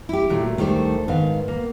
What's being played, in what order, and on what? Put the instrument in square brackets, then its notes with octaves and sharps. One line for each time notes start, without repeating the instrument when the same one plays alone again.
[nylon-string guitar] E4 G4
[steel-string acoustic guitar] A#2 F#3 A3
[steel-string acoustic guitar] D2 A4 C5 [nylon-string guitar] D#3 G3 A3
[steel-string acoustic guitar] G#2 D#3 F5 [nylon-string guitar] B3
[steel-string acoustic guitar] A#3